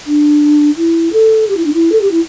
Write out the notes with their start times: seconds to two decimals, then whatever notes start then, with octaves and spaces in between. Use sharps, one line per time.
0.06 D4
0.76 E4
1.13 A4
1.48 G4
1.56 E4
1.65 D4
1.73 E4
1.92 A4
2.01 G4
2.11 E4